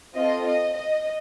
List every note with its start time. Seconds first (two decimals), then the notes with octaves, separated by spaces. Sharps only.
0.14 C4 F4 A4 D#5
0.46 D#5
0.75 D#5